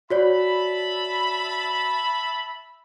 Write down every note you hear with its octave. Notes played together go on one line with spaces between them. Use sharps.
F#4 C#5 D5 E5 A5 B5